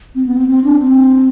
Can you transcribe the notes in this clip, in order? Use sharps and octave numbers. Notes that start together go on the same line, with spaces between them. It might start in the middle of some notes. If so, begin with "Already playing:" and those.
C4
B3
C4
C4
D4
C4